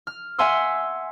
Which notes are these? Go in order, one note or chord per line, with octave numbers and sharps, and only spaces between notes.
F6
E5 F#5 G#5 C6 E6